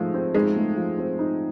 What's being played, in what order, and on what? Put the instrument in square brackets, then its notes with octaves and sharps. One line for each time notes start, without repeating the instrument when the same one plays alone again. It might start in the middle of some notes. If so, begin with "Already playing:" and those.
Already playing: [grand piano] F3 A3 D#4 [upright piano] G#3
[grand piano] C4
[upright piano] G#3 [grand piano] D#4
[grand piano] A3
F3
C4
D#4